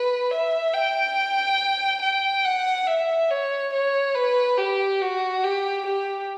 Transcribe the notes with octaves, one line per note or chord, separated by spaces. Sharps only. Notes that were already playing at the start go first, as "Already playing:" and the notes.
Already playing: B4
E5
G5
G5
F#5
E5
C#5
C#5
B4
G4
F#4
G4
G4